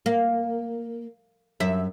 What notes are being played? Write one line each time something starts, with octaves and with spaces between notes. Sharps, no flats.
A#3
F#2 E5